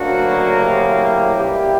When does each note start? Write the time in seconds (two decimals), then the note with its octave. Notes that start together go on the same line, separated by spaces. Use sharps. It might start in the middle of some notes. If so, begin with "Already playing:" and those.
Already playing: D2 C#3 F#3 A#3 D4 F#4
0.61 E4 G4
1.36 B2 G3 A#3 E4 G4